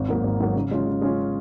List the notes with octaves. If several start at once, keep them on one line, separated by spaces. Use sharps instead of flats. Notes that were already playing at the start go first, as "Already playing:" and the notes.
Already playing: G#1
G#2 F#3 A#3
G#1
G#2 F#3 A#3
C#3
G#3 C#4 F4
C#3
G#3 C#4 F4